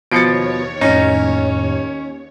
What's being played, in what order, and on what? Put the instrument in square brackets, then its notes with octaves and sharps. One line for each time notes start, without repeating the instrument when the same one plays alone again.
[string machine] D#2 C#5 [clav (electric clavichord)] B2 F3 [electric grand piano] A6 C#7 D7
[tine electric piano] F2 A2 [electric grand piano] C#4 [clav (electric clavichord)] D#4